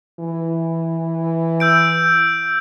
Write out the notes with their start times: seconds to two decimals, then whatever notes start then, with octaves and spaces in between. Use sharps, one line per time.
0.20 E3
1.60 E6 G6 D7